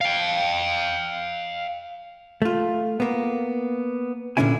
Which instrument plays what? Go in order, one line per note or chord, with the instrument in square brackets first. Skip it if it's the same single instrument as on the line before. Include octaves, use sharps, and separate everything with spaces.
[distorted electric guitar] F5 G5
[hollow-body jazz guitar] A3 F4
A#3 B3
A#2 D3 G#3 C#4 E4 G#5